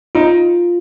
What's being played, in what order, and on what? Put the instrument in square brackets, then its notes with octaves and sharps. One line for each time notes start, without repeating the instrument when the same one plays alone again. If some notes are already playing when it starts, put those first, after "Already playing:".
[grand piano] D#4 [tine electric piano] F4